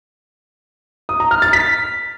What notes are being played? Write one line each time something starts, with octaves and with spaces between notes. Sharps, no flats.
D#6
A#5
F6
A6
B6